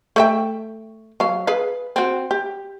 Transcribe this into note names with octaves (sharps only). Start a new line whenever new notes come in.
A3 E5 G5
F#3 F5
G#4 B4 F5
C4 F#4
G4